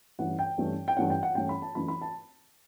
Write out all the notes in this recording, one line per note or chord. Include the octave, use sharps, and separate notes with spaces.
G2 E3 A3 C#4 F#5
G5
G2 E3 A3 C#4
G5
G2 E3 A3 C#4 F#5
G5
F#5
G2 E3 A3 C#4 G5
B5
A5
F#2 E3 A3 D4 B5
B5
A5